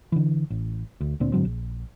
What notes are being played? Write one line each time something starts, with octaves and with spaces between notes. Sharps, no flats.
D3 E3
A1
D2
D2 A#2 C4 D4
G#2 D3 F#3 C4
A#1